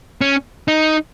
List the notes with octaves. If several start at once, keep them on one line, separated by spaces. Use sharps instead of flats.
C#4
D#4